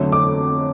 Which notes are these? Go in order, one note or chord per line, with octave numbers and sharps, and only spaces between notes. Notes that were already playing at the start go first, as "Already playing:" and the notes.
Already playing: F2 D3 F#3 A3
D6